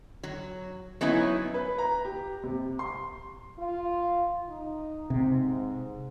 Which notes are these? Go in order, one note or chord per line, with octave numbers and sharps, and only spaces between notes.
F#3
F#3 B3 C#4 D#4 E4
B4
A#5
G4
C3
C6
F4
D#4
G#2 C3